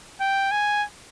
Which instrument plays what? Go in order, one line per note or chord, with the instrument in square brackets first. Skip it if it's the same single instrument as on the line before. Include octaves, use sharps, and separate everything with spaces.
[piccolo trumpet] G5
G#5